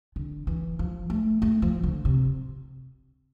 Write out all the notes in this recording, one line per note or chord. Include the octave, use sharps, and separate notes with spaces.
D3
E3
F3
A3
A3
F3
D3
C3